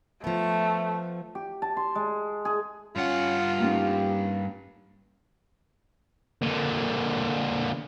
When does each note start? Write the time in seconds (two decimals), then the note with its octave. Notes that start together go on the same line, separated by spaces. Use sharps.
0.24 F3 A3 B3
1.35 G4
1.62 A5
1.77 C6
1.95 G#3
2.45 G#4
2.96 G2 C#4 F4 F#5
3.60 A#3 C#4 D#4 G4
6.42 A#2 D3